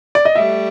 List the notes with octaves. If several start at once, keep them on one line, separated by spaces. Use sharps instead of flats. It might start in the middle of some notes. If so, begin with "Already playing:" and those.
D5
D#5
G3 A3 E5